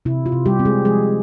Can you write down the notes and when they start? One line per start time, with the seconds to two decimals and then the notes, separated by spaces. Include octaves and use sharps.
0.05 C3 E4
0.26 F4
0.32 C3
0.46 G3 G4
0.59 C4
0.65 G#3 G#4
0.85 F3 G#3 G#4